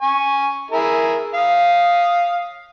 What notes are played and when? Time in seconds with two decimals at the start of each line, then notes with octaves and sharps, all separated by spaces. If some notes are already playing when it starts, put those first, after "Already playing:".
0.02 G#5 C#6
0.71 E4 G#4 A#4
1.34 F5 D#6